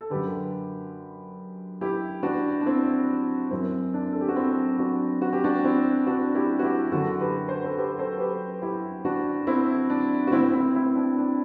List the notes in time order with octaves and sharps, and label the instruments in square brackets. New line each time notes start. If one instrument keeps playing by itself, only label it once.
[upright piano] A4
F#2 D3 G4 B4
E4 G4
D4 F#4
D4
C4 E4
F#2 E3 C4
D4
A4
G4
F#4
C4 E4
D4 F#4
F#4
G4
D4 F#4
C4 E4
D4 F#4
E4 G4
F#4
E4 G4
F#2 D3 F#4 A4
G4 B4
C5
A4 C5
G4 B4
A4 C5
G4 B4
E4 G4
D4 F#4
C4 E4
D4
F#4
A2 C4 E4
E3
C4 E4
C4 E4
D4
D4